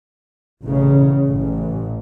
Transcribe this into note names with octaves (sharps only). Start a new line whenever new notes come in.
A1 C#3
A1